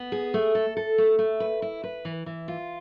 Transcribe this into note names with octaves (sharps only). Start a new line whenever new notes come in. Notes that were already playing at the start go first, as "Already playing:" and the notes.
Already playing: B3
G#4
A3
A4
A4
A3
A3
B4
E4
B4
E3
E3
F4